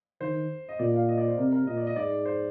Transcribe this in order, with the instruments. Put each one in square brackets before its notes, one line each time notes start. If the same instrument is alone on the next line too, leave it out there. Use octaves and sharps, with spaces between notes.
[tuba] D#3 [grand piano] C5
[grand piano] D#5
[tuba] A#2 [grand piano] D5
[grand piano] F5
D#5
D5
C5
[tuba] C3 [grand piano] A#4
[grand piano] A#4
[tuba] A#2 [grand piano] D#5
[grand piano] D5
D#5
[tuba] G#2 [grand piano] D5
[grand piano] C5